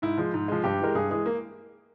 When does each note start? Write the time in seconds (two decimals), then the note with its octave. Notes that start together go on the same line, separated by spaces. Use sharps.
0.02 G#2 E4
0.18 F3 G#3
0.34 G#2
0.48 F3 G#3
0.64 G2 G4
0.80 E3 G#3 A#4
0.95 G2 G#4
1.11 E3 G#3 G#4
1.26 A#3